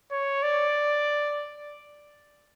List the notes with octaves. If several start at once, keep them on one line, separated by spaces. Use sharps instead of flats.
C#5
D5